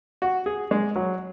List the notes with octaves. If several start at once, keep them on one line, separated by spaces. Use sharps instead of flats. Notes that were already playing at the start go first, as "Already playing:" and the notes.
F#4
G#4
G#3
F#3